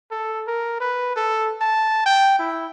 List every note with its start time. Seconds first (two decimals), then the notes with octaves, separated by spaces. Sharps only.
0.11 A4
0.47 A#4
0.80 B4
1.17 A4
1.61 A5
2.06 G5
2.39 E4